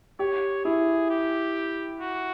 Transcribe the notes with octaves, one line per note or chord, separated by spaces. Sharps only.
G4 C#5
E4 G#4
G4
F#4